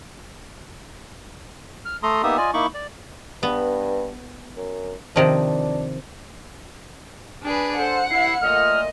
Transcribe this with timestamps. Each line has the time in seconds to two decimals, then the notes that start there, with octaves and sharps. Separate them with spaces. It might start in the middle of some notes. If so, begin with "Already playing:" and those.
1.85 F6
2.03 A3 A4 A#5 C6 D#6
2.23 A#3 B3 D#4 G4 E5 D#6
2.37 F4 D5 D#5 G#5
2.54 A#3 D#4 E4 B5 C#6 D6
2.74 D5
3.43 G2 B3
4.57 F#2
5.16 C3 D#3 F3 D4
7.43 D4 G#4 B4
7.77 A4 C5 F#5
8.10 C2 E4 C7
8.41 A#2 A3 D#5 F6